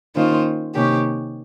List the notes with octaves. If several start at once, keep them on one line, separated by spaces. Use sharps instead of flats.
D#3 A#3 C#4 F4 C5
C3 D#3 A#3 C#4 G4